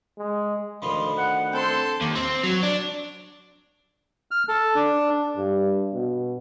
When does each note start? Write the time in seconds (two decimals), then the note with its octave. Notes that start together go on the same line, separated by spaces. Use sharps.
0.18 G#3
0.82 D2 D#3 F3 B5 C6
1.18 F#5
1.52 C4 A4 G5 C6
2.02 D#2
2.16 C4
2.44 F#3
2.63 D4
4.31 F6
4.49 A4
4.75 D4
5.37 G2
5.93 B2